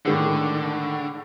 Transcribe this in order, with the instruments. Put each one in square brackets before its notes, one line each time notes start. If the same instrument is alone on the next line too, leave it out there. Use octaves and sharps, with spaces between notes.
[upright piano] A2 D#3 G#3 [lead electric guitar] D3